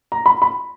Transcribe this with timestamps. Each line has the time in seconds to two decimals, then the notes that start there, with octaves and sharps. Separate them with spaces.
0.12 A#5
0.26 B5
0.42 B5